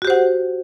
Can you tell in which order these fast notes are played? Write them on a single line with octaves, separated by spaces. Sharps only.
F#4 G4 C5 F#5